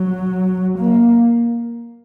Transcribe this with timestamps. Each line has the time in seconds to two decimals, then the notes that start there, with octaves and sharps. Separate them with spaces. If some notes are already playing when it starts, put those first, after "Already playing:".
Already playing: F#3
0.79 A#3